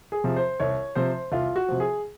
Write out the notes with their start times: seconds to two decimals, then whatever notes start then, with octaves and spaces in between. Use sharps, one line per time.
0.12 G#4
0.24 C3 F3
0.36 C5
0.60 C2 C#5
0.95 C3 F3 C5
1.32 C2 F4
1.56 F#4
1.68 C3 F3
1.80 G#4